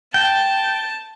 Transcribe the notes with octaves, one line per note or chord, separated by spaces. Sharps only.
G5 A5